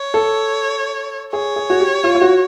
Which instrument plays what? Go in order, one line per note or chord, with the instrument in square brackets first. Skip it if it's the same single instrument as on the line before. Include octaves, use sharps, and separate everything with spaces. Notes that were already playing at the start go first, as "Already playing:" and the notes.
Already playing: [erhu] C#5
[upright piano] A4
[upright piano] G#4 [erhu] C#5
[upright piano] G#4
F#4
G4
F4
F4
F#4